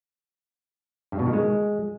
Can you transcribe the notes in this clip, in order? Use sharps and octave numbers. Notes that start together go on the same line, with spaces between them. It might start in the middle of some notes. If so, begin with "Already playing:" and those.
G2
B2
D#3
G#3